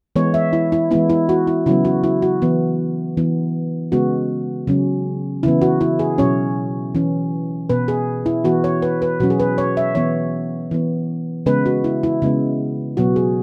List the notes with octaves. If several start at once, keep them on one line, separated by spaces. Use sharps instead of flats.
E3 G#3 B3 C#5
E5
E4
E4
E3 G#3 B3 E4
E4
F#4
E4
C#3 F#3 B3 E4
F#4
E4
F#4
E3 B3
E3 B3
C#3 G#3 B3 F#4
C#3 F#3 C#4
C#3 E3 B3 E4
F#4
E4
G#4
B2 F#3 C#4 C#5
E3 C#4
B2 B3 B4
G#4
E4
E3 B3 F#4
C#5
B4
B4
B2 F#3 C#4 F#4
G#4
B4
C#5
E5
E3 B3 C#5
E3 B3
C#3 G#3 B3 B4
F#4
E4
E4
C#3 G#3 B3
B2 F#3 B3 F#4
G#4